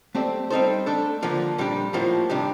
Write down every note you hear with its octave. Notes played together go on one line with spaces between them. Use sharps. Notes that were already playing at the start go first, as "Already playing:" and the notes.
A3 C4 G4 D5
G3 C4 D#4 A4 C5
A3 D4 A4
D3 F3 A#3
A#2 G3 D4 G4
A2 F3 A#3 F4 C5
C3 D#3 G3 D4 G4